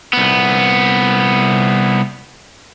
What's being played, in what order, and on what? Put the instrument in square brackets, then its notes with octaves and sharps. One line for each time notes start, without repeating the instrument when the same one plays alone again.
[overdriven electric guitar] C2 B3